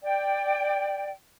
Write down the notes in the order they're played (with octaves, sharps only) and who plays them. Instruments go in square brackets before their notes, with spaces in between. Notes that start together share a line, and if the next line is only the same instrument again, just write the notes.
[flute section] D5 G5